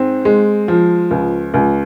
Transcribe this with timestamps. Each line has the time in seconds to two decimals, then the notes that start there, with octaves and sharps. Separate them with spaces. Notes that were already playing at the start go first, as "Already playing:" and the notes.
Already playing: G#2 C4
0.25 G#3
0.68 F3
1.11 C#2
1.54 C#2